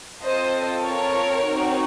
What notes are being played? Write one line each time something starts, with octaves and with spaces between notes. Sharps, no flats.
C4 F4 A4 C5 D#5
A#4 C#5
C4 D#4 F#4